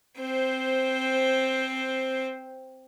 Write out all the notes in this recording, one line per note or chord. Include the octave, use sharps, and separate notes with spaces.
C4 C5